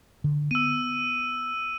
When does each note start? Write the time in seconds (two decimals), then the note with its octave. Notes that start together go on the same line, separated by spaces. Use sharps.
0.24 D3
0.51 B3 E6 D#7